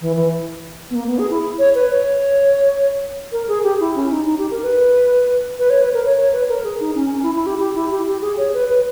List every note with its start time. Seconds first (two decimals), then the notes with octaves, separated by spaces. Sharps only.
0.01 E3
0.16 E3
0.91 B3
0.95 A#3
1.07 B3
1.19 G#4
1.30 E4
1.59 C#5
1.75 B4
1.90 C#5
3.32 A#4
3.48 G#4
3.63 G4
3.80 E4
3.96 C#4
4.11 D#4
4.27 D#4
4.38 G4
4.51 A#4
4.63 B4
5.59 B4
5.70 C#5
5.81 B4
5.94 A#4
6.05 C#5
6.17 C#5
6.33 B4
6.49 A#4
6.64 G#4
6.80 D#4
6.95 C#4
7.11 C#4
7.23 E4
7.35 E4
7.46 G4
7.59 G4
7.75 E4
7.91 G4
8.06 G4
8.21 G#4
8.38 C#5
8.53 B4
8.69 B4